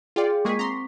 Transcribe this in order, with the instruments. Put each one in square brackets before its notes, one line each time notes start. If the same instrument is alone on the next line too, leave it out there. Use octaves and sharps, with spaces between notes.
[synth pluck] F4 D5 [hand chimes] G#4 G5
[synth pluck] G#3 A#3 G#4 [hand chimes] C#6 B6
[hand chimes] C4 [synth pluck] A#5 C6